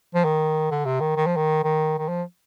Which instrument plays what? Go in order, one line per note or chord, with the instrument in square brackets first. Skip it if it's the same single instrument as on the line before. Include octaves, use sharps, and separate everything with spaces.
[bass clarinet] F3
D#3
D3
C3
D#3
D#3
F3
D#3
D#3
D#3
F3